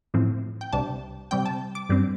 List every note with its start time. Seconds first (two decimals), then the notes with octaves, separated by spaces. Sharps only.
0.14 A2 F3 C4
0.61 G5
0.73 C2 C3 G3 D4 A5
1.31 C3 G3 C4 G5
1.46 A5
1.75 D6
1.89 G2 G3 C4